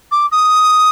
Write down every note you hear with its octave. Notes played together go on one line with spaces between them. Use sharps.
D6
D#6